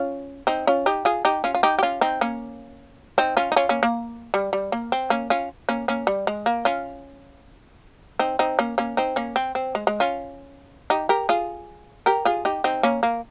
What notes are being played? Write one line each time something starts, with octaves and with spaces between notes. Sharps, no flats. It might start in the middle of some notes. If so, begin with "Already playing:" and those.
Already playing: C#4 F4
C4 D#4
C#4 F4
D#4 G4
F4 G#4
D#4 G4
C#4 F4
F4
D#4 G4
G4
C#4 F4
C4 D#4
A#3 C#4
C4 D#4
C#4 F4
D#4
C#4 F4
A#3 C#4
A#3
G3
G3
A#3
C4
A#3 C#4
C#4 F4
A#3 C#4
A#3 C#4
G3
G#3
A#3
C#4 F4
C4 D#4
C4 D#4
A#3 C#4
A#3 C#4
C4 D#4
A#3 C#4
C4
C4
G#3
G#3
C#4 F4
D#4 G4
G4 A#4
F4 G#4
G4 A#4
F4 G#4
D#4 G4
C4 D#4
A#3 C#4
A#3